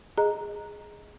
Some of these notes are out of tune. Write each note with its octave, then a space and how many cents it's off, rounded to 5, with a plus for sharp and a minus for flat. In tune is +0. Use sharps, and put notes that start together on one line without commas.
G#4 +0 D#5 +0 A#5 +0